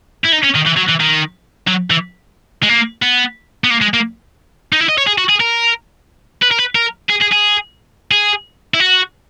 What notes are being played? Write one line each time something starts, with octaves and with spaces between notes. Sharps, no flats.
E4
D#4
C#4
D#3
E3
F#3
E3
D#3
F#3
E3
G#3
A#3
B3
B3
A#3
G#3
A#3
D#4
E4
D#5
C#5
G#4
F#4
G#4
A#4
B4
A#4
B4
A#4
G#4
G#4
G#4
G#4
E4
F#4